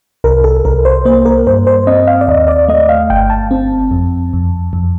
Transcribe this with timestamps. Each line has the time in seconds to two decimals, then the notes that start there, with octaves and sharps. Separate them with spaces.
0.24 C2 A#4
0.44 A4
0.65 C2 A#4
0.85 C5
1.05 A#3 C5
1.25 A#4
1.47 G2 C5
1.67 C5
1.87 C4 D#5
2.07 F5
2.21 D5
2.28 D#2 D#5
2.48 D5
2.68 A3 D#5
2.89 F5
3.10 G1 G5
3.30 A5
3.51 C4
3.91 F2
4.33 F2
4.73 F2